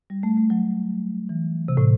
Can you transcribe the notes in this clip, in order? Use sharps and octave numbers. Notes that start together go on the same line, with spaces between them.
G3
A3
A3
F#3
E3
C3
A2